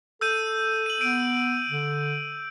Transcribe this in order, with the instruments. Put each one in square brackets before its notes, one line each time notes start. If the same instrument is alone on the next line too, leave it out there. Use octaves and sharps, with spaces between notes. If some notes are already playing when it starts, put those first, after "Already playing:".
[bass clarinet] A4 [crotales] E6 G6 D#7
[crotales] D#7 F#7
[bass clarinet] B3 [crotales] E6 D7 D#7
[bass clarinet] D3